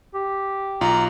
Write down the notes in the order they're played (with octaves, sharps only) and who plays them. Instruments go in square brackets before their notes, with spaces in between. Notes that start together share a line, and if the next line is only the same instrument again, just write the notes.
[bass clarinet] G4
[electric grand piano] B1 F4 [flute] A#5